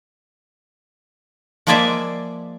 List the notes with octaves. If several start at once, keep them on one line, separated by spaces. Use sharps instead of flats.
F3 G#3 A#3 G#4 D5 E5